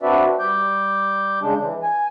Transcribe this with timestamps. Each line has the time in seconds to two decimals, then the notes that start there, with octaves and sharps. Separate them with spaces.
0.02 C4 D4 F#4 B4 D5 E5
0.39 G3 D6 G6
1.42 C#3 G#3 D4
1.61 E3
1.83 G#5